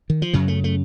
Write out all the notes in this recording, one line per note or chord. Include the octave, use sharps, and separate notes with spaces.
D#3
F3
F#2 C#3 F#3
A3
A3